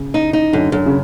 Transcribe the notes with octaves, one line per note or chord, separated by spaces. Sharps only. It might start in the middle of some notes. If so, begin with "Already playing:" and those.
Already playing: C#3
D#4
D#4
F#2 D3
F#2 D3
C#3